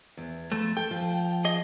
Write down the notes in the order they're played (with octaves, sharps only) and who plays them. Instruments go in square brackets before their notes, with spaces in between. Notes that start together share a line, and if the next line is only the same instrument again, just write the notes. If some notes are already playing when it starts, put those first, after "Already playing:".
[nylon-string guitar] E2
[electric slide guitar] F2 A3
[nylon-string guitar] A4 [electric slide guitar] G5
[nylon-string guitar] F3
[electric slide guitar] G#4 D#5